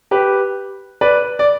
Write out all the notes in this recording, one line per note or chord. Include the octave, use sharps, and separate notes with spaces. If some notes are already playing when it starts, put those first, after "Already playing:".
G4 B4
B4 D5
D5